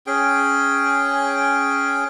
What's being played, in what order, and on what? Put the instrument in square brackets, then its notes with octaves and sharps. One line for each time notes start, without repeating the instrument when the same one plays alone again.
[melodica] C#4 G#4 G5